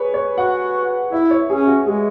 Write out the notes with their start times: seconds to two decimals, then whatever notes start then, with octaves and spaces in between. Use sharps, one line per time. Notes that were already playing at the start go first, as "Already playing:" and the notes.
Already playing: G#4 B4 C#5
0.14 C#5
0.38 F#4 F#5
1.12 E4 E5
1.31 C#5
1.49 C#4 G#4
1.67 F#4
1.87 G#3 G#4